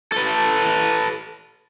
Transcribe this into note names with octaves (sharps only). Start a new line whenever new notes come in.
A4 B4